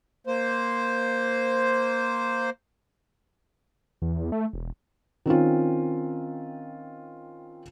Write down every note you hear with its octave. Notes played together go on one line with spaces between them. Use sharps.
A#3 C5
E2
E2
A3
E1
D#3 C4 C#4 F4